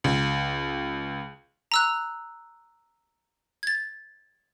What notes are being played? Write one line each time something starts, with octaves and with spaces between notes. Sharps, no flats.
C#2
A#5 E6 F#6
G#6 A6